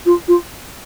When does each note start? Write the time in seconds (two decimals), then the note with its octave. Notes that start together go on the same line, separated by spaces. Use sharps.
0.06 F4
0.28 F4